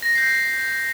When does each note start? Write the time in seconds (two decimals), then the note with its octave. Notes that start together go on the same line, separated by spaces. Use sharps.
0.02 A#6
0.15 G6 C7